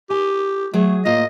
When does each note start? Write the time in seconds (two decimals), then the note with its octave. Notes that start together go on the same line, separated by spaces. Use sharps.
0.10 G4 G#5
0.74 F#3 A3 G#4
1.05 A2 A#3 F4 D#5